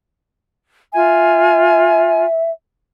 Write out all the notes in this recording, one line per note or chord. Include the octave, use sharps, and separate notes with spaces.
F4 E5 G#5